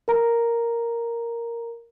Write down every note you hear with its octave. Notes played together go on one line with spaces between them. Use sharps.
A#4 A#5